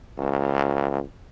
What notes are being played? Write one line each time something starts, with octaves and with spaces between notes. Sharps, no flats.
C#2